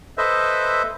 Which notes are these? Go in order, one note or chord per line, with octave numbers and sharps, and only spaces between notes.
A4 B4 C5 D#5 E5